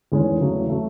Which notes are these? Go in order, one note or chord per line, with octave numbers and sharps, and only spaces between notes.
E2 D#3 G#3 C#4
E2 C#3 F#3 A3
C#3 F#3 A3